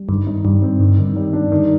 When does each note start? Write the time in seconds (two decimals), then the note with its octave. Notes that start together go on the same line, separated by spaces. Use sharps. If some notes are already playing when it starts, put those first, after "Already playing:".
Already playing: G3
0.09 G2 D#3
0.27 D#4
0.44 G2 G3
0.62 C4
0.80 G2 D#3
0.98 D#3
1.16 G3
1.33 D4
1.52 D#3